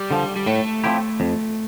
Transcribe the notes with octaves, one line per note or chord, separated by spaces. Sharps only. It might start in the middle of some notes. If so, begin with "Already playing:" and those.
Already playing: G3
D3 F3
G3
A2 A3
F3 C4 E4 G4
F2